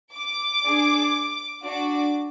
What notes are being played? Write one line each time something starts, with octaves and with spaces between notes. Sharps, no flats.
D6
D4 G#4
D4 F#4 D6